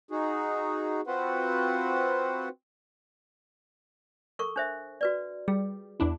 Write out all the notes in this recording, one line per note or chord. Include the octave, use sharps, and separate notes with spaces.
D#4 F#4 G#4
C4 F4 F#4 B4 C5 F#5
A4 A#4 C#6
D4 C5 E5
F#4 B4 D5
G3 G#4
E2 D4 E4